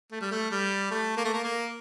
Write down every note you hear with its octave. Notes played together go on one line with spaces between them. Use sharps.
A3
G3
A3
G3
A3
A#3
A3
A#3
A#3